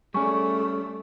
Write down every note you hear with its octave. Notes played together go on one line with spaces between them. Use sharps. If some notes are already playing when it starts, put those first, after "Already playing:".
G3 A3 C#4 G#4 D5 G#5 C#6